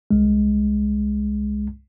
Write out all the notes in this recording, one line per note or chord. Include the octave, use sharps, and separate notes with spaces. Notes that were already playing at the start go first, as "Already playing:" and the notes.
C2 G#3